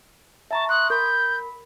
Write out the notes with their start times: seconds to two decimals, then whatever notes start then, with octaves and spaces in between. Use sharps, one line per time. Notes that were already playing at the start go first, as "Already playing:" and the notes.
0.51 E5 A5 A#5 C#6
0.69 C6 D#6 F#6
0.90 A#4 B5 G6